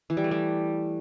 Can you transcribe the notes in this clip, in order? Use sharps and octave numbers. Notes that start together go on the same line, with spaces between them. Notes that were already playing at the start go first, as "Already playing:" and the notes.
E3
G3
A3
G3